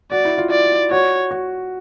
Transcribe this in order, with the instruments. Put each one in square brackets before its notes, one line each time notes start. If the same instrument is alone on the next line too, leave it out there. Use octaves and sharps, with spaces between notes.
[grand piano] F#4 [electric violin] D5
[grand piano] E4
F4
[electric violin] D5
[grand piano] F#4 [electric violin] C#5
[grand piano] F#4